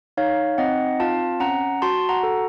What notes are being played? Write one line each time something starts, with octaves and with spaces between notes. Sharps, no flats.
D#4 C#5 F5
C4 D#5 F#5
F4 F5 A5
C#4 F#5 A#5
F#4 A5 C6
F#5 A#5
A4